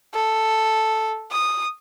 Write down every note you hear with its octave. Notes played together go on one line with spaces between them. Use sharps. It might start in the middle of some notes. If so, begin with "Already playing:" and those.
A4
D#6